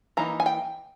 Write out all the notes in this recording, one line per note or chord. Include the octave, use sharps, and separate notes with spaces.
E3 A#3 D#4 A#5
G#5
G5